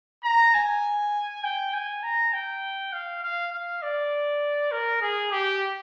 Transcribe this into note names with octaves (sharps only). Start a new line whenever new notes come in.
A#5
G#5
G5
G#5
A#5
G5
F5
F5
F5
D5
A#4
G#4
G4